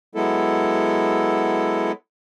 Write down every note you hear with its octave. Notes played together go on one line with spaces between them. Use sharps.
F#3 G#3 B3 E4 A4